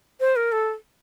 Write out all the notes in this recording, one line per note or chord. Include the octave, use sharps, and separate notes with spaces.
C5
A#4
A4